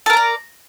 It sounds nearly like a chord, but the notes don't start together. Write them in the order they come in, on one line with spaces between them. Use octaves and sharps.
A4 A#4 A#5 D5